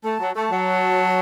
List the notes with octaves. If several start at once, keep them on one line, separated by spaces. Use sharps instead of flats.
A3 A5
F#3
A3 A5
F#3